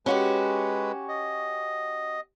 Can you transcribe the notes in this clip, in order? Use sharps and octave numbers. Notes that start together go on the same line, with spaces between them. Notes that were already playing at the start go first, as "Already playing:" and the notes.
G#3 C#4 F#4 G4 B4
D#5